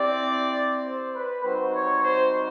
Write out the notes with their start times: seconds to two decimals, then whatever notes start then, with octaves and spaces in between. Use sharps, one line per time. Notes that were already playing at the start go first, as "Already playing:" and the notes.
Already playing: C4 E4 G4 D5
0.86 C5
1.15 B4
1.44 G3 C4 D#4 F#4 C5
1.74 C#5
2.03 C5